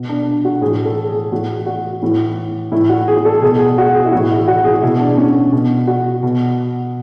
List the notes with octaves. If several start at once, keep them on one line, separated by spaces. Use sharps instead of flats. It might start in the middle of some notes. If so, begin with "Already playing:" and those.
Already playing: B2
D4
F#4
A2 E3 G#4
A4
G#4
A2 E3 F#4
F#4
A2 E3
A2 E3 E4
F#4
G#4
A4
B2 G#4
G#4
F#4
G#4
E4
A2 E3 F#4
E4
F#4
G#4
B2 E4
D4
C#4
B2
F#4
B2